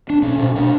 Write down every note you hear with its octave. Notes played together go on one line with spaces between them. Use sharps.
D4
B2 C#4
B2
B2 D4